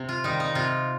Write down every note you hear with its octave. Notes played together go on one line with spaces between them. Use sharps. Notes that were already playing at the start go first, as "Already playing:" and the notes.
Already playing: C3
F4
D#3 G3 D#4
D#4
C3 F4